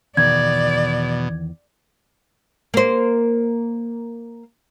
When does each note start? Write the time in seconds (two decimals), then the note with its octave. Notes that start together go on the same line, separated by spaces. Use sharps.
0.17 E2 B2 D#3 D5 G#6
2.74 A#3 C5